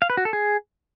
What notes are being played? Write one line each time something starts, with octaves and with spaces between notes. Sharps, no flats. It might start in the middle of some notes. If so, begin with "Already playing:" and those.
F5
B4
F#4
A4
G#4